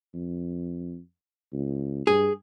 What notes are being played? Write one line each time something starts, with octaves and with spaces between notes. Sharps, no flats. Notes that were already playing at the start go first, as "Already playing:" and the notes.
F2
C#2
G2 G#4